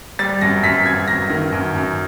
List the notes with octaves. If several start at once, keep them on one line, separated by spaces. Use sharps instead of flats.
G3 A6
F#2 A#6
F#2 B6
F#2 G#6
F#2 A#6
D#3
F#2
F#2